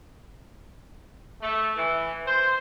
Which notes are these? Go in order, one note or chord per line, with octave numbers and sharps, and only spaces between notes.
A3
E3
C5